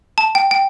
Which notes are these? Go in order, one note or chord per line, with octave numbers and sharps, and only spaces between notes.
A5
G5
G5